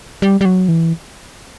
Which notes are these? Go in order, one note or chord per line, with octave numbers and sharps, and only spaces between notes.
G3
G3
F#3
E3